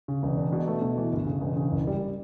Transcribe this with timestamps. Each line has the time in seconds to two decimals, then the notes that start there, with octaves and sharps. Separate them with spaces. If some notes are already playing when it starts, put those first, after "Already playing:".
0.08 C#3
0.23 E1
0.37 D4
0.53 B2
0.68 A3
0.82 B2
0.98 E3
1.13 G1
1.27 C#3
1.41 E1
1.56 C#3
1.72 F#1
1.87 G3